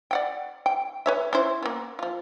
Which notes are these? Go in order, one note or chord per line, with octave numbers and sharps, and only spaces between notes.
D5 F#5 G5
G5
B4 C#5 E5
C#4 E4 C5
A#3 B3
F3 F4